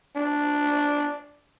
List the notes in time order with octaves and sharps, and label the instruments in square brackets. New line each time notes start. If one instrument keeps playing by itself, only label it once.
[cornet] D4